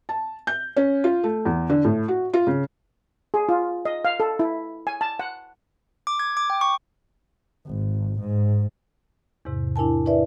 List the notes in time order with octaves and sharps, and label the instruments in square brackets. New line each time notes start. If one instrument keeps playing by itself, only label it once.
[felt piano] A5
G6
C#4
F4
A3
E2
D3
A2
F#4
F4
C#3
[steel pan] G#4
F4
D#5
F5
A4
E4
G#5
A5
F#5
[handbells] D6
G#6
D6
G5
C#6
[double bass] G#1
G#2
[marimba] E2 G#2 C3
D4 E4 A#4 G#5 A5
E4 B4 D5 E5